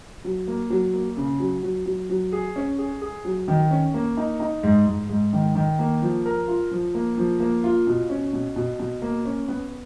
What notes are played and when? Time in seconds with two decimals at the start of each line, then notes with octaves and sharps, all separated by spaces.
0.25 F#3
0.48 A#3
0.70 F#3
0.94 A#3
1.17 C#3
1.39 F#3
1.63 F#3
1.86 F#3
2.09 F#3
2.32 G#4
2.56 C#4
2.78 G#4
3.02 G#4
3.25 F#3
3.48 D#3
3.71 C#4
3.94 A#3
4.17 D#4
4.40 D#4
4.63 G#2
4.86 G#2
5.09 G#2
5.33 D#3
5.55 D#3
5.79 A#3
6.02 F3
6.26 A#4
6.48 F4
6.71 F3
6.95 A#3
7.18 F3
7.40 A#3
7.64 F4
7.87 B2
8.10 C#4
8.33 B2
8.56 B2
8.80 B2
9.02 A#3
9.25 C#4
9.48 B3